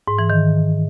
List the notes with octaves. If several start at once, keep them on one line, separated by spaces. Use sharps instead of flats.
G#2
E3
D#3